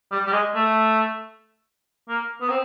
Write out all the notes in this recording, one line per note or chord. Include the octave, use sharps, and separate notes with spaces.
G3
G3
G#3
A3
A#3
B3
C4